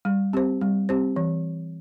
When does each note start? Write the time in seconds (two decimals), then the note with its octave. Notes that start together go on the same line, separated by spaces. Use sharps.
0.05 G3
0.33 C4 G4 C5
0.61 G3
0.89 C4 G4 C5
1.16 E3